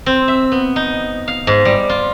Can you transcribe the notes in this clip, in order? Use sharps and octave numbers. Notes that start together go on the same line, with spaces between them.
C4
E5
B3
D#4
F5
G#2
G3
F4